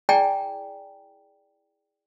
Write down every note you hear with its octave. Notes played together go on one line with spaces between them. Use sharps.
E4 G#4 D5 G5 G#5 A#5